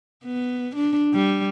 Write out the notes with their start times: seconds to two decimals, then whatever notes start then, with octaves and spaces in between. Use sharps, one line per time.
0.24 B3
0.76 D4
1.13 G3